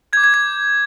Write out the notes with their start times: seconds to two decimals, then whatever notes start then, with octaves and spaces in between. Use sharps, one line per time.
0.13 G6 G#6
0.17 D6
0.24 G#6
0.34 G#6